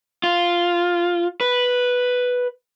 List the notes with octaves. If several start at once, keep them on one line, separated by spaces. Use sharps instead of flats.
F4
B4